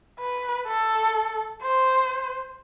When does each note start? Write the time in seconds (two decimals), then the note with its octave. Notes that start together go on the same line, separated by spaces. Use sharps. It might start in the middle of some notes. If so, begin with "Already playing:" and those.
0.20 B4
0.67 A4
1.62 C5